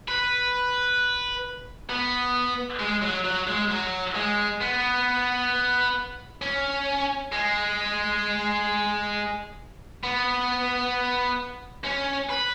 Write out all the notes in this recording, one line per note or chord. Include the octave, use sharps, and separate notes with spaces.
B4
B3
G#3
F#3
F#3
G#3
F#3
G#3
B3
C#4
G#3
B3
C#4
B4